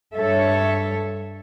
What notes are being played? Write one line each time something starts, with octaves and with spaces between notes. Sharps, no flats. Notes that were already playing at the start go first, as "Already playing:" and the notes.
G2 A4 C#5 E5